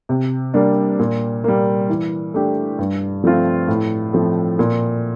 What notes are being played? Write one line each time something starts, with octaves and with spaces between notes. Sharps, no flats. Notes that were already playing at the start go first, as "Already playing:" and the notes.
C3
G3 A#3 D4
A#2
G3 A#3
E3
A3 D4 G4
G2
F3 A3 C4 F4
A2
F3 A3 C4
A#2